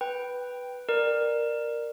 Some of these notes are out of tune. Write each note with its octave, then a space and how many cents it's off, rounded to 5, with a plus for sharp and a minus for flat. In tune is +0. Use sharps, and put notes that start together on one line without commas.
B4 +0 G5 +0
A#4 +0 D5 +20